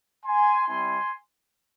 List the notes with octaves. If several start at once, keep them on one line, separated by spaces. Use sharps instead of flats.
G#5 C6
G3 C4 E4 G#5 C6